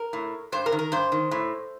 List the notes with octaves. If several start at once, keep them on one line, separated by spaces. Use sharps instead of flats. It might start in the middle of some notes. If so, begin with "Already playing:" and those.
Already playing: A#4
A2
G2 C5
A#4
D#3
A#4
G2 C5
D#3
A2